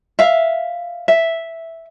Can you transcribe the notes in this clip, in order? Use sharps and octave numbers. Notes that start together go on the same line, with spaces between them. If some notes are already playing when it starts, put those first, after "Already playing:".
E5 F5
E5